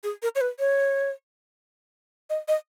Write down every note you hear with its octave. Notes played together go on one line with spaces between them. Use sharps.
G#4
A#4
C#5
B4
C#5
D#5
D#5